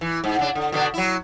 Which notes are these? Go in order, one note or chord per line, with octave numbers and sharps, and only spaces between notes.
E3
G#2
C#3 D4
D3
B2 D3 D4
F#3 E4